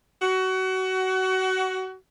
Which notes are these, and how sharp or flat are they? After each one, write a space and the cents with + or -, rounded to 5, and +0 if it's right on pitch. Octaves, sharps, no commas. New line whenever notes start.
F#4 +25